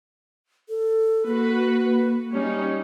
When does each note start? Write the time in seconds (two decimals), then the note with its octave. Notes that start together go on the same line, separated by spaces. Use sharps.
0.69 A4
1.26 A#3 F#4 B4
2.31 G3 C#4 D#4